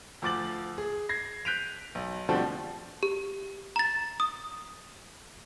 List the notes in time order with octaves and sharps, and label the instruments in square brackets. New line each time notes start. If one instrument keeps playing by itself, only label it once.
[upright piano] D2 F3 D6 A6 F#7
G#4
G#6 A#6 C7
F#6 G6 B6 D7 D#7 F7
B1
B2 D3 F3 G3 A3 C4
[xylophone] G4
A#5 A6
D#6